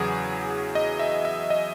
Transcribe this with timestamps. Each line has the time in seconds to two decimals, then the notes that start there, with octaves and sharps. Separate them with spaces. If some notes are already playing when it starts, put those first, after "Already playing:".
Already playing: E2 C#3 F#3 G#4
0.75 D#5
1.00 E5
1.25 E5
1.50 D#5